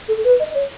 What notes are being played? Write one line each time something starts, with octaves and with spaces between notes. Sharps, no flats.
A4
B4
D#5
C#5